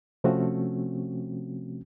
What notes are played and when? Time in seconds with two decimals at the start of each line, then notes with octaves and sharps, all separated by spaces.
0.24 C3 F3 A3 C4 C#4 F#4